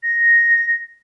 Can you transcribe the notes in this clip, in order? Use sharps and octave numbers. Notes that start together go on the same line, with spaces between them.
A#6